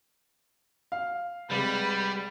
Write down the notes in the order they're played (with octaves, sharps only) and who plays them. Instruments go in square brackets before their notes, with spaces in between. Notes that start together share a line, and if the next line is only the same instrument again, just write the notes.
[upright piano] F5
[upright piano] C2 G#3 [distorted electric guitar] G3 [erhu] B4